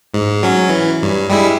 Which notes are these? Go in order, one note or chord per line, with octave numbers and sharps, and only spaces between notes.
G#2
F#3 C#4
E3
G2
G3 G#3 E4